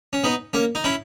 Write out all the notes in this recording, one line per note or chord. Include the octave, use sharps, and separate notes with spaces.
C#4
B3 D#4
A#3 C#4
D#4
C#4 E4